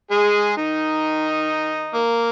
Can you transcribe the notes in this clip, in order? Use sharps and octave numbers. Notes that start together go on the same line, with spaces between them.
G#3 G#4
D#3 D#4
A#3